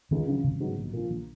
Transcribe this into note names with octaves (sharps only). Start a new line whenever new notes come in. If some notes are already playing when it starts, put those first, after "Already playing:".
C#2 D#3
C#3 F#3
G#1 C#3
G#2 F#3 B3 F#4
A#1
A#2 F3
A#1